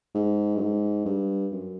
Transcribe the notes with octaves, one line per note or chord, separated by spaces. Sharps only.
G#2
G2
G#2
G2
F#2